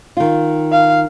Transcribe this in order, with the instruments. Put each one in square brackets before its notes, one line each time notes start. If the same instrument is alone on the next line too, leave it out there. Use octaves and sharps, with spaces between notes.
[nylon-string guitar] D#3 F4
[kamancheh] F5